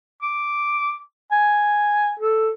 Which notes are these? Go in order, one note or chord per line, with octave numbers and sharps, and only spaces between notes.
D6
G#5
A4